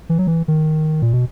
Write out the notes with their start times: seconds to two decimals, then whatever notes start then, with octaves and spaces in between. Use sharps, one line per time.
0.09 E3
0.19 F#3
0.27 E3
0.48 D#3
1.02 A#2
1.13 B2